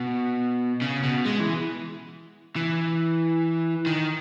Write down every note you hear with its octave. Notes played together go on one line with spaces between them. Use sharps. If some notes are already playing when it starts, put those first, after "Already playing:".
Already playing: B2
C#3
B2
G#3
E3
E3
D#3